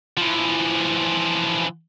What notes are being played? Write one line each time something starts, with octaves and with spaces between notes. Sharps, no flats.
E3 F3